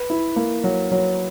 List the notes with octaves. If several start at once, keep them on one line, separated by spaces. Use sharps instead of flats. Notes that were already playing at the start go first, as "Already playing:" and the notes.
Already playing: B4
E4
A#3
F#3
F#3